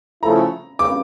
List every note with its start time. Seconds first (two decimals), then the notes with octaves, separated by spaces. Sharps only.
0.23 C#3 F3 A3 E4 A4 A#5
0.79 D6